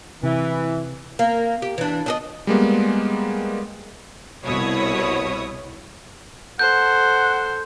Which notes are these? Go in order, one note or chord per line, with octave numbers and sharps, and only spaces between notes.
C3 E3
A#3
G4
E3 D4
D4 G#4 D#5
G3 G#3 A#3 B3
C2 B2 E4 C#5 D#6
A4 C5 F#5 G6